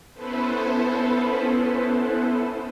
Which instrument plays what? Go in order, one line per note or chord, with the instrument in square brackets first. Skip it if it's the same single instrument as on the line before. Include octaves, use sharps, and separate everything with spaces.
[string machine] B3 C#4 E4 A4 B4 C5